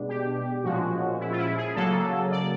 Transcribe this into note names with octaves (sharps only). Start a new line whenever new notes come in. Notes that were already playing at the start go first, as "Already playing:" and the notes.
Already playing: B2 G#3 B3 D4
G4
A#2 F3 G#3 C#4 F#4
E4
F4
E4
G#4
C#3 F#3 A#3 A4
D5